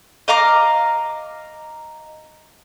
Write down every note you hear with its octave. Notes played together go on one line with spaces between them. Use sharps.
D#5 F5 A#5 D6